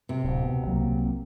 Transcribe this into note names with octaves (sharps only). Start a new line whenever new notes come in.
C3
D1
B2
C2 F#3 A#3